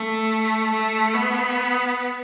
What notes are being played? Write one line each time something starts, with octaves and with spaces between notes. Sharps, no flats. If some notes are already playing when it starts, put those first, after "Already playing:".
Already playing: A3
A3
B3